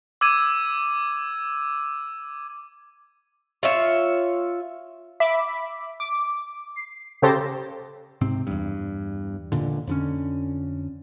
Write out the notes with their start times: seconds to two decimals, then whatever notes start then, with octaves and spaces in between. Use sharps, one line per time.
0.21 D6 E6 G#6 D#7
3.63 F4 C#5 E5
5.20 E5 B5 D6 B6
6.00 D6
6.76 C7
7.22 C#3 G4 A4 C5 A6 A#6
8.21 G#2 C3 C4
8.47 E2 G2
9.52 E1 A#2 D3
9.87 F2 D3 C#4